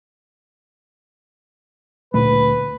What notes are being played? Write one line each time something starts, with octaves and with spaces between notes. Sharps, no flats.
D2 A#2 A3 B4